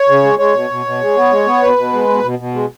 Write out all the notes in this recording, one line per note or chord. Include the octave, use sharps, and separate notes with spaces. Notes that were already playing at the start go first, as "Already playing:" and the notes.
Already playing: C#5
C#3
G#3
G#3 C#5
B2
B2
B2
G#3
B3
G#3
B3
B2 B4
B2
G#3
B2
B2
B2
G#3